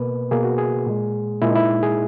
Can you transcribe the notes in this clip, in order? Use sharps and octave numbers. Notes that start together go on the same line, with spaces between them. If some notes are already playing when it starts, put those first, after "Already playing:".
Already playing: B2 A#3 B4
B2 A#3 G#4
F#4
G#4
A#2 G#3
A#2 G#3 E4
D#4
E4
G#4